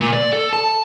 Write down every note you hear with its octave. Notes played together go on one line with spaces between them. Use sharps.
A#2
D5
A4
A5